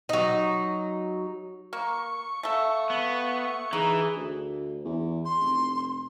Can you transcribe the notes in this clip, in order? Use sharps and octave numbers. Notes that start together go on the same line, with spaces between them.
F#3 D#4
A#3 C#6
A3 A4 F5
B3
E3 D#4 G#4
D2
E2
C6
F1